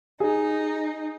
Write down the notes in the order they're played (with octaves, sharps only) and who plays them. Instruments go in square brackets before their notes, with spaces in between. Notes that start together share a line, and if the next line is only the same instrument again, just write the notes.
[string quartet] D#4 [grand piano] G#4